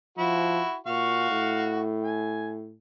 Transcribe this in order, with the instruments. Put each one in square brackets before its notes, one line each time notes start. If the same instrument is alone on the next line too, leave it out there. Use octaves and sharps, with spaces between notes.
[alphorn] F3 [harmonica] E4 F#4
[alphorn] A#2 [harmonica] F#4 F5 C#6
[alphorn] A2
[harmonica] G#5